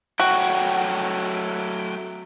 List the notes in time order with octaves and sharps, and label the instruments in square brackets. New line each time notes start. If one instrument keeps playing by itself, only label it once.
[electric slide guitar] F#3 A3 G5 [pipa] F#4